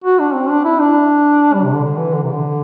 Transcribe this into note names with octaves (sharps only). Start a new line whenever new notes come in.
F#4
D4
C4
D4
E4
D4
G3
C3
D3
D3
E3
D3
C3
D3